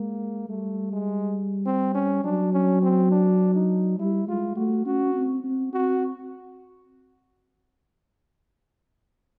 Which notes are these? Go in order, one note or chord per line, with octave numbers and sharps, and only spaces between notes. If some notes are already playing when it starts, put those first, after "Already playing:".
Already playing: G#3 A#3
G3 A3
G#3
C4
C#4
F#3 D4
C#4
C4
D4
D#4
G3 E4
G#3 F4
A3 F#4
C#4 F#4
C4
C4
C4 F#4